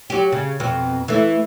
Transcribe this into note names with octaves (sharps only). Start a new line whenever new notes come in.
F#3 G4
C#3
F2 B2
E3 A3